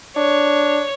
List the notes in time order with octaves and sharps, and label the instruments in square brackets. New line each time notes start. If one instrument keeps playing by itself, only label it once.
[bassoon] D4 [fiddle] C#5